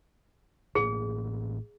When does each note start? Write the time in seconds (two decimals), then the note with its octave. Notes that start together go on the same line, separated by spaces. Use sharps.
0.75 A1 A2 A#3 G#4